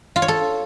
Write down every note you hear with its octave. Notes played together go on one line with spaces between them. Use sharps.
F4
C#5
A4